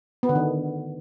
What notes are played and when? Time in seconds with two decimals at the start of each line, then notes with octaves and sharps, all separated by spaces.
0.23 B3
0.29 D3
0.35 D#3